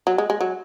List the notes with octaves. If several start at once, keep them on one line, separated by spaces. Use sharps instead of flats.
F#3
G#3
G#3
F#3